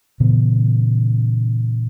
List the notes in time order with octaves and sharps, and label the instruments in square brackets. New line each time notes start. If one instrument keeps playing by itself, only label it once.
[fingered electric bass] A#2 C#3 E3 B3